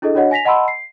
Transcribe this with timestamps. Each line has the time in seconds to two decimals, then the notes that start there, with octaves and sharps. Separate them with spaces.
0.02 D4 E4 G#4 A4 D#5
0.15 D4 F#4 C#5 D#5 F#5
0.31 G#5 A#6 B6 F7
0.45 D#5 F#5 A5 B5 C6 E6
0.68 C7